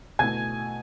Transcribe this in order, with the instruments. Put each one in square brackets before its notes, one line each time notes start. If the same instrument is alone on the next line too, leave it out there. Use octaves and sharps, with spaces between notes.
[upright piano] B2 A3 E4 G#5 G#6